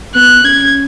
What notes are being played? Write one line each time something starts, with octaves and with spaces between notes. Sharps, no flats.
B3 F#6
C#4 G#6